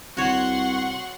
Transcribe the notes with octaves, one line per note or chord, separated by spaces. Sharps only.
C2 F#4 C#5 F#5 C6 C#6